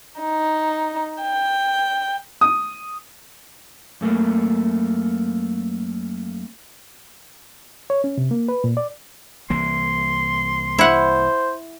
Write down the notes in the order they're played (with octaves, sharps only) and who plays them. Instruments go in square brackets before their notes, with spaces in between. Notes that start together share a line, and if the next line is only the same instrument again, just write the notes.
[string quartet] D#4
G5
[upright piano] D#6
[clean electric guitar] F#2 A3 A#3
[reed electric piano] C#5
C#4
C3
A#3
B4
A#2
D5
[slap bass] C2 E3 A#3 [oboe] C6
[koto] E4 F#5 [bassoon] C5